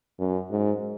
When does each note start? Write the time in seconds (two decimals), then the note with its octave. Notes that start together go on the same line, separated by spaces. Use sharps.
0.19 F#2
0.50 G#2